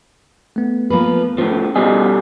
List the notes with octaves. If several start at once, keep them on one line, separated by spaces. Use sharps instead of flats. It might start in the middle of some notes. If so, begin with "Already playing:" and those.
A3 B3
F3 A#3 B4
A2 F3 C#4
B2 G3 G#4 D#5